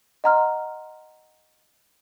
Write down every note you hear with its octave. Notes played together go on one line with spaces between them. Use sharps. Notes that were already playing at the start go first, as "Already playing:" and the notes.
D#5 F#5 A#5 C6 F6